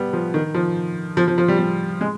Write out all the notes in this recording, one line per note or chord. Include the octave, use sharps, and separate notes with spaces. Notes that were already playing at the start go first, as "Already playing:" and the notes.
Already playing: G3 B3
F3
D#3
F3
F3
F3
F3
G3
G3
G#3